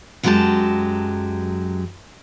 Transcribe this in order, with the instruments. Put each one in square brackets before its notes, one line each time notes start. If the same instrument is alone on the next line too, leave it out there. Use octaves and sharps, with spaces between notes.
[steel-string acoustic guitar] F#2 F#3 G#3 F#4 G4 A5